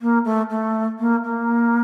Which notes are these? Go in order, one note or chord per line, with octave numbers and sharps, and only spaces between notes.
A#3
A3
A3
A#3
A#3